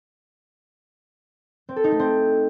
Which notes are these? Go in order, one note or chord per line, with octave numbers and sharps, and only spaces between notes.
C4
A4
D#4
A3
C4